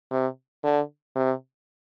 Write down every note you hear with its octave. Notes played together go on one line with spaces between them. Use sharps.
C3
D3
C3